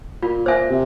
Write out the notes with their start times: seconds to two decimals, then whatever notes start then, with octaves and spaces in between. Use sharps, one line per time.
0.22 A#2 F4
0.46 A#2 C5 E5 G#5
0.70 C3